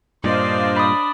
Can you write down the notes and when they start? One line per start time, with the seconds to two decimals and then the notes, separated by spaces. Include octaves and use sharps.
0.24 G2 A#2 D4 C5 D5 D#5 F5
0.76 B5 D#6